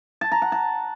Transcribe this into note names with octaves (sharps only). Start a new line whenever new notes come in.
A5
A#5
F#5
A5